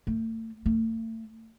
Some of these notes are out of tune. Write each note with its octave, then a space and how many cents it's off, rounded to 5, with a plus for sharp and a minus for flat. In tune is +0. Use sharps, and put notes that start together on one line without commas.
A3 +35
A3 +35